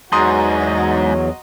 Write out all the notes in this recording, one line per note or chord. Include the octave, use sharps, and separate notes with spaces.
E2 G#2 F#3 F#4 D#5 A#5 C6 D#6